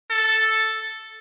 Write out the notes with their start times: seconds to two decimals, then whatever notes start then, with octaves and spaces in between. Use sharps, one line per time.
0.11 A4